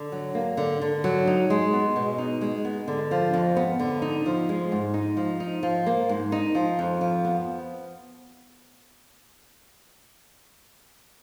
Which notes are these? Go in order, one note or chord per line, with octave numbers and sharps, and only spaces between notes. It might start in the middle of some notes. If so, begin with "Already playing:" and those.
Already playing: D3
F#3
A#3
D3
D3
F#3
D#4
G#3
B3
B2
D#4
G#3
B3
D3
F3
F2
B3
D3
D#4
F3
G#3
G#2
D#4
F3
D#4
F3
A#3
G#2
D#4
F3
F2
F3
B3